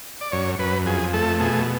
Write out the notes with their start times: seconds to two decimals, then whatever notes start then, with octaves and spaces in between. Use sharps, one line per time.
0.21 D5
0.32 F#2 C#5
0.59 F#2 B4
0.86 F2 G#4
1.13 A3 A4
1.40 B2 G#4